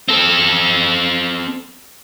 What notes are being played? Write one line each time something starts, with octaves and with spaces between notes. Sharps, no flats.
C4 A4